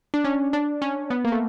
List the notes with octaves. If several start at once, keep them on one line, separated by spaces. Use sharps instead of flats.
D4
C#4
D4
C#4
B3
A#3
A3